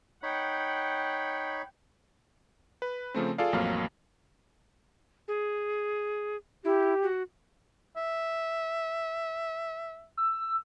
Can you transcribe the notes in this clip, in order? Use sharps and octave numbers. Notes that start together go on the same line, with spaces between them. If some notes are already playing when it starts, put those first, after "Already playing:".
D#4 C#5 F#5 G5 B5
B4
C#3 F3 A3 C4
F4 G#4 A4 D5 F5
A1 F2 F#3 A#3 F5
G#4
E4 G4
F#4
E5
E6